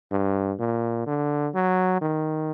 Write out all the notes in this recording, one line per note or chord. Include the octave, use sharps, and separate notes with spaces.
G2
A#2
D3
F#3
D#3